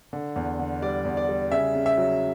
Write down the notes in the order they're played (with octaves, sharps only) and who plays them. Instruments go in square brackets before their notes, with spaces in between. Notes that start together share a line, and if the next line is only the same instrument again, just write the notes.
[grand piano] D3
E2
D3
G3 D5
E2
D5
G3
C#3 E5
C#3
E5
F#3